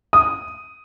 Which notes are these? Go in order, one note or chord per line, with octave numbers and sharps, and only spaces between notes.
D#6